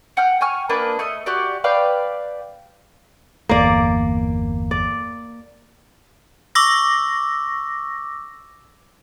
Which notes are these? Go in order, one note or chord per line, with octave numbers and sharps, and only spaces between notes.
F#5 G5 F6
G5 G#5 C#6 F6
A#3 D4 B4 D#5
A3 D#5
F#4 G4 D5
B4 D5 F5 G5
G1 E2 A#3 D5
D5
C#6 D6 E6 A#6